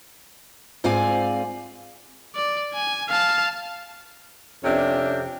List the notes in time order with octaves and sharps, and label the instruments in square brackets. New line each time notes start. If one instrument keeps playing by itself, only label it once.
[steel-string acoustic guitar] G#2 C4 F4 D5 F5 G#5
[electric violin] D5
G#5
F5 A5
[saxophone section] F2 C3 C#4 D4